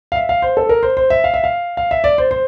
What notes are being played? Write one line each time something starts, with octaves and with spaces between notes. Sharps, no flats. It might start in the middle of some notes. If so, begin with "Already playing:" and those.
F5
E5
F5
C5
A4
A#4
C5
C5
E5
F5
E5
F5
F5
E5
D5
C5
C5